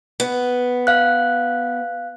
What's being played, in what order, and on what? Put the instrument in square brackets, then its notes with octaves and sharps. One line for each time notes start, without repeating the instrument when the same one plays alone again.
[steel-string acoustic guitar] B3
[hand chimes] F5 F#6